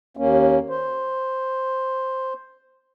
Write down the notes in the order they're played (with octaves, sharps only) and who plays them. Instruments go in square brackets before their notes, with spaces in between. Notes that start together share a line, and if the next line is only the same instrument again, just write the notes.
[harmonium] D#2 A#3 C#4
C5